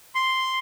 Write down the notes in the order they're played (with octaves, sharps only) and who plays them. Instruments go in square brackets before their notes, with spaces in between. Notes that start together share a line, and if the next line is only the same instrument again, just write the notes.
[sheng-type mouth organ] C6